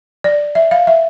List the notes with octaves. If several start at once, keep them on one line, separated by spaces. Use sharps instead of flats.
D5
E5
F5
E5